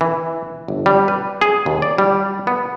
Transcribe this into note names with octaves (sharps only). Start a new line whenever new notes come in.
E3
G1
G3
B4
G#4
D#2
D5
G3
B3